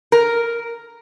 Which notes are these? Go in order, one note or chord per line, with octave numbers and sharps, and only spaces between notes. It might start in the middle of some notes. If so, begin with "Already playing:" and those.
A#4